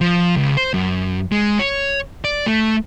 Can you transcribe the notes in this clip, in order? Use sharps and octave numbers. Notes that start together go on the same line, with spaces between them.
F3
C#2
C5
F#2
G#3
C#5
D5
A3